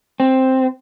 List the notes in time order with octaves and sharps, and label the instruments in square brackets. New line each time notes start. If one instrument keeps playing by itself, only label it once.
[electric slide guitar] C4